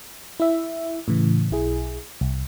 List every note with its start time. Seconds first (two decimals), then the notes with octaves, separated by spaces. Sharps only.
0.40 E4 E5
1.08 A2 C#3 E3
1.51 B1 E4 G#4
2.21 C2